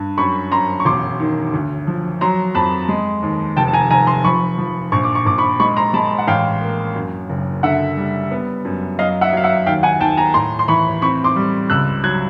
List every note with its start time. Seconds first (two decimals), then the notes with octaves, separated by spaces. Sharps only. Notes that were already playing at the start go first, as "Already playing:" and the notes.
Already playing: G2
0.18 F#2 B5 C#6
0.52 F#2 A#5 C6
0.80 C#6
0.85 E1 C6 D6
1.20 D#3
1.53 D2
1.87 F3
2.21 F#3 A#5 C6
2.55 F2 A5 B5
2.88 G#3
3.22 D#2
3.56 F1 G5 A5
3.68 A5
3.73 G#5 A#5
3.90 F1 G#5 A#5
4.07 A#5 C6
4.24 F3 B5 C#6
4.58 F3
4.92 A#1 C#6
5.04 D6
5.15 C#6
5.26 A#1 D6
5.38 B5 C#6
5.60 G#3 B5 C#6
5.77 A#5 C6
5.94 G#3 A5 B5
6.18 F#5
6.27 A1 F5 G5
6.62 A#3
6.95 F#2
7.29 F#1
7.63 D3 E5 F#5
7.97 G3
8.31 B3
8.65 F#2
8.99 F#3 D#5 F5
9.21 E5 F#5
9.33 F#3 F5
9.44 E5 F#5
9.66 D#2 F5 G5
9.83 F#5 G#5
10.00 D#2 G5 A5
10.17 G#5 A#5
10.34 A2 A#5 C6
10.59 C6
10.68 E3 B5 C#6
11.02 C4 B5 C#6
11.24 C6 D6
11.36 G3
11.70 C#2 E6 F#6
12.04 F#3 F#6 G#6